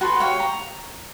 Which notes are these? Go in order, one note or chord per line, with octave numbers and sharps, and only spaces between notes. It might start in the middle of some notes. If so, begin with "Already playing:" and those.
F#4 A4 B4 C6
C#5 F5 G5
A#5